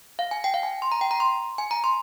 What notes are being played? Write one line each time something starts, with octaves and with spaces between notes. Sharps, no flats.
F5
G#5
G5
F5
G#5
C6
A#5
G5
A#5
C6
G#5
A#5
C6